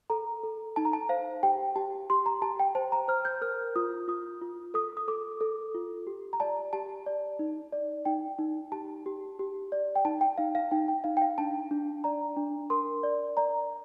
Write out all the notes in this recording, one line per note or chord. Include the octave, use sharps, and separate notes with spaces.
A4 A#5
A4
D#4 A5
A#5
A5
C5 F5
G4 G5
G4 A5
G4 C6
A#5
G4 A5
G5
C5 A5
A#5
C5 F6
G6
A#4 F6
F4 D#6
F4 D#6
F4
A4 D#6
D#6
A4 D6
A4
F4
G4
A#5
D5 A5
G4 A5
D5
D#4
D5
D#4 G5
D#4
G4 A5
G4
G4
D5
G5
D#4 A5
G5
D#4 F5
F5
D#4 G5
G5
D#4 F5
G5
F5
D4 A5
D4
D5 A#5
D4
A#4 C6
D5
D5 A#5